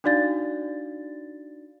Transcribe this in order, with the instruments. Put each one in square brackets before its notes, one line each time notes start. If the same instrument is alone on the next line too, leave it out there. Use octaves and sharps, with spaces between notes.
[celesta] D4 D#4 F#4 D5 F5 A6